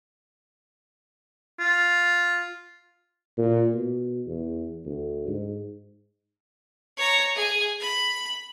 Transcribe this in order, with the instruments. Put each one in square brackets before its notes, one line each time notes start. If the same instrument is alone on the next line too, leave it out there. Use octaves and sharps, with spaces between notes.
[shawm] F4
[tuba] A#2
B2
E2
D2
G#2
[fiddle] C#5 A#5
G#4 G#5
B5